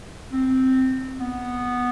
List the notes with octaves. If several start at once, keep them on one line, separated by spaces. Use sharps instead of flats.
C4
B3